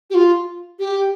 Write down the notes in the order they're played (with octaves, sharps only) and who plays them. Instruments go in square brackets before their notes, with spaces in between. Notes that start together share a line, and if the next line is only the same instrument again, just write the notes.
[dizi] G4
F4
G4